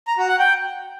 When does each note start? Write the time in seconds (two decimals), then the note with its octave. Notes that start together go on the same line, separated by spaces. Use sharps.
0.07 A#5
0.18 F#4
0.28 F#5
0.39 G5